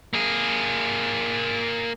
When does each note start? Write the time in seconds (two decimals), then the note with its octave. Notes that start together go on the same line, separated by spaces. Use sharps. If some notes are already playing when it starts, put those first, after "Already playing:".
0.13 A#3 G#4